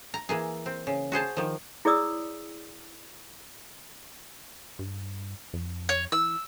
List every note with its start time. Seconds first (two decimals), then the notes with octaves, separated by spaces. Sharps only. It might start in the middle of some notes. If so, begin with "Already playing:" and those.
0.14 A#5
0.29 E3 A#3 G#4
0.66 C4
0.87 C#3
1.12 F#4 G#4 C5 A5
1.37 D#3 F3
1.85 E4 G#4 C#5 D5 D#6 E6
4.79 G2
5.53 F2
5.89 C#5
6.12 E3 E6